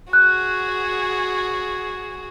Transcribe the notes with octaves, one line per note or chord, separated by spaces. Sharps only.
F#4 G#4 F#6